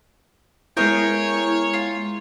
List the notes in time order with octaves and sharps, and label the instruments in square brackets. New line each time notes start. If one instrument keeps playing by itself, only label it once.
[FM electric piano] G#3 B3 E4 [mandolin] G#4 A#4 G5 [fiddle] C#5
[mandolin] F4